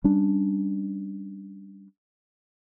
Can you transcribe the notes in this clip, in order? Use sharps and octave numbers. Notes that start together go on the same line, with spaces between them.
G3 C#4 D4